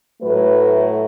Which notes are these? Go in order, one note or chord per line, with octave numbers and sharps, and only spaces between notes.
A2 F#3 A3 B4